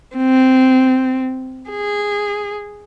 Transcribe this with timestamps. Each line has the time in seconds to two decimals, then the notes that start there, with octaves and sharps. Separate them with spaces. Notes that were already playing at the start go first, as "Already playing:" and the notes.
0.17 C4
1.70 G#4